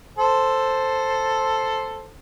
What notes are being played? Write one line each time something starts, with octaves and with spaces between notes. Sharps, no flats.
A4 C5